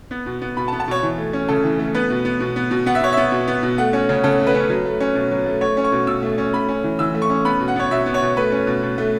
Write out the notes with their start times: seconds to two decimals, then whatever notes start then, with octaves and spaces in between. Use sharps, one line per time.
0.11 B3
0.26 B2
0.41 B3
0.57 B2 B5
0.68 A5
0.72 B3
0.80 A5
0.88 B2 C#5
1.03 E3
1.18 A3
1.33 C#4
1.49 C#3 A4
1.64 E3
1.79 A3
1.95 B3 B4
2.10 B2
2.25 B3
2.40 B2
2.56 B3
2.71 B2
2.86 B3 F#5
2.95 E5
3.01 B2 C#5
3.13 B3 E5
3.32 B2
3.48 B3
3.63 B2
3.78 A3 F#5
3.93 C#4
4.09 C#3
4.24 C#3 A4
4.40 A3
4.47 B4
4.54 C#4
4.69 F#3
4.85 A3
5.00 C#4
5.15 B2
5.31 F#3
5.46 A3
5.61 A3 C#5
5.77 C#4
5.84 C#6
5.92 B2
6.07 B2 E6
6.23 A3
6.38 C#4
6.53 A3 B5
6.69 C#4
6.84 E3
6.99 E3 E6
7.15 A3
7.22 C#6
7.30 C#4
7.45 B3 B5
7.60 B2
7.68 F#5
7.76 B3 C#5
7.91 B2 E5
8.06 B3
8.14 C#5
8.22 B2
8.37 A3 B4
8.52 C#4
8.67 B2
8.83 B2
8.98 A3